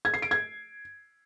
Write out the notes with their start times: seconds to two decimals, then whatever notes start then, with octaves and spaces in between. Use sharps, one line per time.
0.05 G#6
0.14 C7
0.22 D7
0.31 G#6